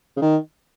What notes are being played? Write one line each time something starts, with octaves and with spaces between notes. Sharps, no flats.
C#3
D#3